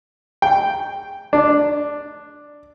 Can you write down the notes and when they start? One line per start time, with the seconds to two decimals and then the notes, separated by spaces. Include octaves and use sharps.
0.42 G5
1.33 D4